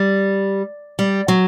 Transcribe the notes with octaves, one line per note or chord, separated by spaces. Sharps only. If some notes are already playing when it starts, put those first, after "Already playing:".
Already playing: G3
G3
F#3